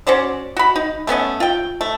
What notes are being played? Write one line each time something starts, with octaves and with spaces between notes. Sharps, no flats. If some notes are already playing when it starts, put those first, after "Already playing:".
C#4 F#4 C5 D5
F#4 B5
D#4
A3 B3 C#4 D#5
F4 G5
A3